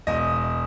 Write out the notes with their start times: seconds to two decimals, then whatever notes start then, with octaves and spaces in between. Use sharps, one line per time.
0.07 E1 D#5